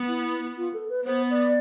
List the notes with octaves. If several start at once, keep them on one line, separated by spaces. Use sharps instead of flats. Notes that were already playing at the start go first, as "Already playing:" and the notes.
Already playing: B3
E4
F4
A4
B4
B3 C5
D5